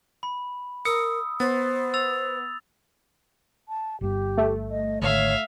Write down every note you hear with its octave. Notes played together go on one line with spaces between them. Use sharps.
B5
A#4 D#6 E6 C#7
B3 C5 A6
E6 A6 F7
A5
G1 G2 G4
A3
D#5
G#1 D3 C#5 E5 F5